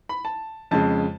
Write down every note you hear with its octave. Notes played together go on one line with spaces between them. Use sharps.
B5
A5
F2 C#3 G#3 A5